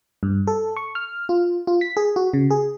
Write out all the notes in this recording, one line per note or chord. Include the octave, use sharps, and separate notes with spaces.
G2
A4
C#6
F6
F4
F4
B6
G#4
F#4
C#3
G#4